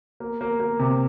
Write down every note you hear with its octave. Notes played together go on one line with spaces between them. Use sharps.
A#3
A#3
A#3
C3